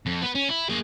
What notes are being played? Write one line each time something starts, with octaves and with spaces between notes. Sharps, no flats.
F2
B3 B4
C#4
E4
A#3 G#4